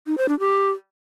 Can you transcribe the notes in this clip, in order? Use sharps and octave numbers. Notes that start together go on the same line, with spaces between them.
D#4
C5
D4
G4